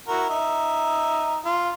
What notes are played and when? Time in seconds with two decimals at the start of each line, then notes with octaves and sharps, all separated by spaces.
0.08 E4 F#4 A#4
0.30 D#4 E5
1.45 F4